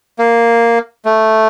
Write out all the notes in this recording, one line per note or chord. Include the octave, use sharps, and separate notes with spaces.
A#3
A3